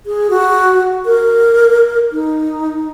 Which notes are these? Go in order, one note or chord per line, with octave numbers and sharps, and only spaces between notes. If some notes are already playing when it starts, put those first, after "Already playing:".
G#4
F#4
A#4
D#4